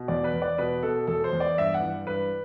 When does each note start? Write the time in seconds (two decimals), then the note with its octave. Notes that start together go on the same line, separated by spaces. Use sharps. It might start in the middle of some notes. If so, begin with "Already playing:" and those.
Already playing: B2
0.08 E2 D5
0.24 B4
0.33 E2
0.42 D5
0.58 B2 B4
0.83 B2 A4
1.07 E2 A4
1.24 C5
1.33 E2
1.40 D5
1.58 G2 E5
1.74 F#5
1.82 E3
2.07 G2 B4